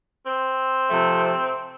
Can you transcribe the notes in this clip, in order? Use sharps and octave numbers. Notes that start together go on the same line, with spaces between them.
C4
C3 F3 A3